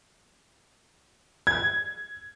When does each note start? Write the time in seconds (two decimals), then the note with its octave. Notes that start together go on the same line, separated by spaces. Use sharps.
1.47 G#6